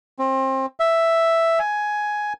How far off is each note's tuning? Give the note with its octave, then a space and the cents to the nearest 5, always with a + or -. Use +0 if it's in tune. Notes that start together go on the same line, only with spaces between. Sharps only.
C4 +30
E5 +5
G#5 +10